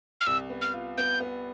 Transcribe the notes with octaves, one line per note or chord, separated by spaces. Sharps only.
F6
C2 E6
B3
F6
F4
B3 G6
B3